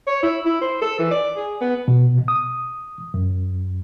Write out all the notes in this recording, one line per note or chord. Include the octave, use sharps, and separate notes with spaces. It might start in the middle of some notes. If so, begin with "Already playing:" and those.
C#5
E4
E4
C5
A4
E3
D5
G#4
B3
B2
D#6
F#2